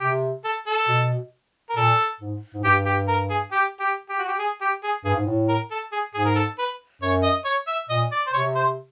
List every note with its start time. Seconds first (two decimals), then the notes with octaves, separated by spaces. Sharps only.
0.01 C3 G4
0.44 A4
0.67 A4
0.88 B2
1.70 A#4
1.76 A#2 A4
2.20 G#2
2.54 G#2
2.64 G2 G4
2.86 G4
3.08 A#4
3.30 G#4
3.52 G4
3.80 G4
4.09 G4
4.19 F#4
4.28 G4
4.39 G#4
4.61 G4
4.83 G#4
5.05 G2 G#4
5.16 G#2
5.26 A2
5.48 A#4
5.71 A4
5.92 G#4
6.14 G#2 G#4
6.25 A#4
6.35 A4
6.58 B4
7.01 F#2 C#5
7.23 D#5
7.45 C#5
7.67 E5
7.89 A#2 D#5
8.12 D5
8.26 C5
8.33 C3 C#5
8.55 C5